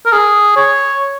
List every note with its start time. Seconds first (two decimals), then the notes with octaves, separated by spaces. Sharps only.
0.06 A#4
0.13 G#4
0.56 C#5